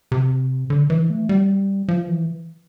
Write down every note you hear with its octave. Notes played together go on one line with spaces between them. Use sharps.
C3
D3
E3
A3
G3
F3
E3